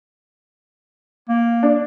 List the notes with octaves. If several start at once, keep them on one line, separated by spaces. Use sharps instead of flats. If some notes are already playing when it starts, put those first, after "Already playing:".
A#3
D4